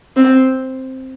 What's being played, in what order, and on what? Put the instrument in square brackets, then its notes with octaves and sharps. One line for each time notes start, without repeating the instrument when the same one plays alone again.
[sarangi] C4